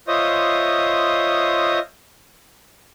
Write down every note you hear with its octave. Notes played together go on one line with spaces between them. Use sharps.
F4 C5 C#5 D#5 E5 D#6